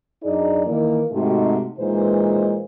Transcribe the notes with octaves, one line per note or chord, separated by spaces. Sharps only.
F#2 D4 D#4 G#4 D5
D#3 E3 A#3
G#2 C3 A3 D#4 F#4 G4
A#2 E3 G#3 D#4 B4 C5